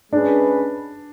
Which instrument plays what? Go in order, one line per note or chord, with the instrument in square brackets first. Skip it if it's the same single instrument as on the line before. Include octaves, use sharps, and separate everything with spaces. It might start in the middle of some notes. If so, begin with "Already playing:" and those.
[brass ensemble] G#3 C#4 G#4 B4 [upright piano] D4